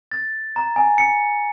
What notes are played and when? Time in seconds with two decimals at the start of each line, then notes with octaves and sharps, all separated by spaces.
0.11 A6
0.56 A#5
0.76 G#5
0.98 C#7